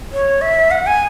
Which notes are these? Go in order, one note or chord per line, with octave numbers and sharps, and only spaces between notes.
C#5
E5
F#5
G#5